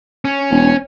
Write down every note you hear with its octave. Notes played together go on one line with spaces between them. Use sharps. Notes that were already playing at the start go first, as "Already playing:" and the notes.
C#4
E1